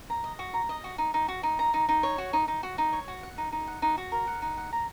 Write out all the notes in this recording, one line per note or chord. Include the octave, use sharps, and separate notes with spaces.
A#5
D#5
F#4
A#5
D#5
F#4
D#4
D#4
F#4
D#4
A#5
D#4
D#4
C#5
F#4
D#4
D#4
F#4
D#4
C#5
F#4
F#5
D#4
D#4
F#5
D#4
F#4
A#4
F#5
D#4
F#5
A#5